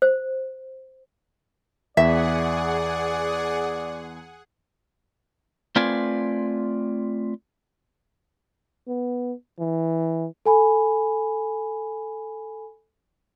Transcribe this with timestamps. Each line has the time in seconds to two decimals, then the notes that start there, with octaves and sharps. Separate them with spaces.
0.02 C5
1.97 E2 G#4 D5 E5 F#5
5.76 A3 C4 F4 B4 D5 G#5
8.88 B3
9.59 E3
10.46 A4 G#5 B5